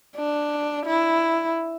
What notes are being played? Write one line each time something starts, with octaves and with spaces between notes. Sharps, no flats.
D4
E4